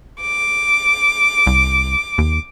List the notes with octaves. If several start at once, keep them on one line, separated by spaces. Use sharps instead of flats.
D6
C2
D#2